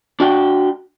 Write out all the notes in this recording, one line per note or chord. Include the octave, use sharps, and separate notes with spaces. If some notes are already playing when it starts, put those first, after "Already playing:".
D4 F#4 G5